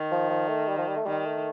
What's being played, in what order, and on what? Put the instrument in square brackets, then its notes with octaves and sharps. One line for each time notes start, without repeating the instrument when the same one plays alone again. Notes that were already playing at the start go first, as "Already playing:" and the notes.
Already playing: [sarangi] D#3
[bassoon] F3
F3
A3
G3
F3
G3
A3
[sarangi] D#3 [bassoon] G3
[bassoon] A3